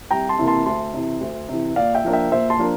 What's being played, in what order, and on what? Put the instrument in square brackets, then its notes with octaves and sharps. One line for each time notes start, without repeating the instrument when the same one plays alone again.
[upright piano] C2 [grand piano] G5 A#5
[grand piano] A5 C6
[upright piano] C3 E3 A#3 E4
[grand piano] A5 C6
[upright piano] D2 [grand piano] A5 C6
[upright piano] C3 E3
D2
C3 E3
[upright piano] A#2 [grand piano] D5 F5
[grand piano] E5 G5
[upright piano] F3 A#3 D4
[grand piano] E5 G5
[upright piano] A#2 [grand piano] C5 E5
[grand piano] A5 C6
[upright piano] F3 A#3 D4